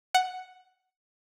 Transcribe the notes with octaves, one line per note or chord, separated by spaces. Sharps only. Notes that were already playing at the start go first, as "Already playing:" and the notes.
F#5